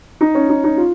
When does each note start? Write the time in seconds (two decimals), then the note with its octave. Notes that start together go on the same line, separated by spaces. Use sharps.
0.21 D#4
0.35 C#4
0.49 D#4
0.64 D#4
0.77 F4